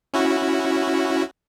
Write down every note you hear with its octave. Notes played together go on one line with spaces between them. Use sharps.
C#4 E4 F#4